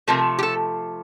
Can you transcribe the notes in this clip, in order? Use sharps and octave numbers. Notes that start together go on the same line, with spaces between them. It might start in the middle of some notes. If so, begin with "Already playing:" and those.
C3 F3 A3 A#4
G4
A4